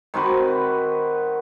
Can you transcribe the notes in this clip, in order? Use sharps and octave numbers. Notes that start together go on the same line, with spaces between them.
D#3 C4 F#4 B4